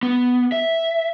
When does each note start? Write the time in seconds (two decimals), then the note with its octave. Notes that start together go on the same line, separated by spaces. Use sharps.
0.03 B3
0.52 E5